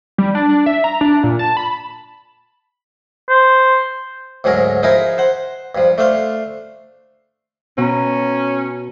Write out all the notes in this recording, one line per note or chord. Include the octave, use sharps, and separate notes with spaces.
G3
D4
D4
E5
A#5
D4
A#2
A5
B5
C5
D2 G#2 F#3 G#4 A#4
F3 D#4 E4 G#4 A#4
C5 F#5
G2 F3
A3 D4 C5 F5
B2 C#4 A#5